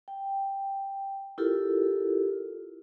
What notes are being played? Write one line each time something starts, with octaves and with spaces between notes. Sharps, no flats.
G5
E4 F4 G4 A4 A#4